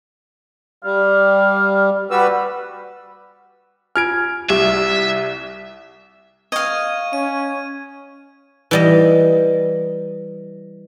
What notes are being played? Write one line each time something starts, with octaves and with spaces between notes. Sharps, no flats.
G3 F5
G3 F#4 B4 E6
F4 G#5 F6 G#6 D7
C2 G4 E5
D#5 F5 C#6 G#6 D#7
C#4 D#7
E3 G3 D#5